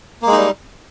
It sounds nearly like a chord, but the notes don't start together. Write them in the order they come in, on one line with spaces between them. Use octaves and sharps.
A#3 G#3 D#4 G3